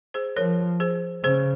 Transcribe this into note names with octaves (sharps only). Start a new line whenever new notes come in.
G#4 C5
F3 A#4 C#5
G#4 C5
C#3 G#4 C5